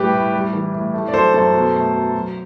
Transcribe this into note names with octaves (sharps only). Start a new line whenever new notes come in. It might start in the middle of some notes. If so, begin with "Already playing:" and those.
Already playing: A2 G3 G4 B4
A2
G3
E3
A2
A3
D5
F#3 A4 C5
F#2 A4 C5
B2
A3
B2
F#3